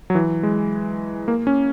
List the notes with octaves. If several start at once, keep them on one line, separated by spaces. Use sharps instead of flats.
F#3
E3
G#3
A#3
C#4